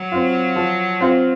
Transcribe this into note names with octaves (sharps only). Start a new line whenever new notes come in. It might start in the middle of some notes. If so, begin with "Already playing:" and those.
Already playing: F#3
C4 F4
F3
C4 F4